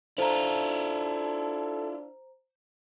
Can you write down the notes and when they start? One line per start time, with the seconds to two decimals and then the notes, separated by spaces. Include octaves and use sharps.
0.18 D4 E4 F4 A4 C5 A#5